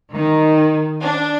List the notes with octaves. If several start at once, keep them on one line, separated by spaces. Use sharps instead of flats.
D#3
D4